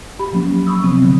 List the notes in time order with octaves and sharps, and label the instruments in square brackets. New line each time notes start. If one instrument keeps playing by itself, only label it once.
[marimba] G4 B5
F3 F#3 A#3 C#4
B5 C#6 D#6 E6
C3 F3 F#3 B3 C4
D3 F#3